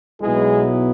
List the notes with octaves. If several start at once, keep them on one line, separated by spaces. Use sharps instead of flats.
B1 B2 F#3 G#3 B3 E4 G#4